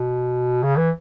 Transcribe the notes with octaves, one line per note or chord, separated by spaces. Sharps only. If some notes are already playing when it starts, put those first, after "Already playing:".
Already playing: B2
C#3
E3